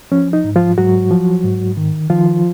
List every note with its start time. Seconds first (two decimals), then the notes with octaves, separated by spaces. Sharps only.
0.12 F3 C#4
0.33 D#4
0.44 G#2
0.55 F3 F4
0.78 G#2 F#3 F#4
1.11 F3
1.44 G#2
1.77 D#3
2.10 D#3 F3 F4